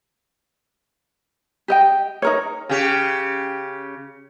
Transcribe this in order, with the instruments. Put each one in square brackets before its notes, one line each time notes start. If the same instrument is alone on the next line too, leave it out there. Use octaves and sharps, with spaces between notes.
[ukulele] G4 D#5 G5
D#4 A#4 C#5
[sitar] C#3 G4